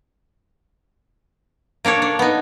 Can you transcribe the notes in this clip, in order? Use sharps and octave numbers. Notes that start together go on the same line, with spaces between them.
A#3 D4 A4 C#5
D4
B3 D#4